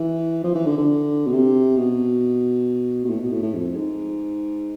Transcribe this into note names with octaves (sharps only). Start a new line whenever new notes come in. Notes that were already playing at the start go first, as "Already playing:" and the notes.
Already playing: E3
F3
E3
D3
D3
B2
C3
B2
B2
A2
B2
A2
A2
F2
G#2